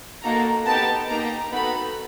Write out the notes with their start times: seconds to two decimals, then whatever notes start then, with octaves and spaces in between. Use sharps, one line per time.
0.23 A#3 D#4 F#4 A4 A#5
0.66 B3 D#4 G4 A5
1.09 A#3 D#4 G4 A#5
1.51 B3 D#4 F#4 A4 B5